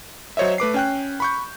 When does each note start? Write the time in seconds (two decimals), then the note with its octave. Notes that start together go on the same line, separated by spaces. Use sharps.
0.37 F#3 C5 C#5 D#5 E5
0.58 A3 B4 D6 C7
0.74 C#4 G5 F#6
1.20 B5 C#6 G6